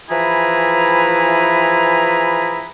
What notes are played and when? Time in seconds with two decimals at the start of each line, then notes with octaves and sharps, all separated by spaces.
0.10 E3 F3 E4 G#4 B4 A#5